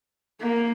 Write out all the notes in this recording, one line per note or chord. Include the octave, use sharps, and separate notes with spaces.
A#3